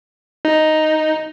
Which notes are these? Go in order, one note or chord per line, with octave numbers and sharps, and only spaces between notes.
D#4